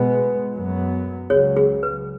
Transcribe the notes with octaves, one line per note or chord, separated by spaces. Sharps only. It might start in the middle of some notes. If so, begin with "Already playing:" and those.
Already playing: B2 G#3 B3 G#4
F#2 F#3 B3
C#2 C#3 F#3 G#4 C#5
G#4
B4